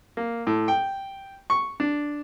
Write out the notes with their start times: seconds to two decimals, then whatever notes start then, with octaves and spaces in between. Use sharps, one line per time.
0.17 A#3
0.47 A2
0.68 G5
1.50 C#6
1.80 D4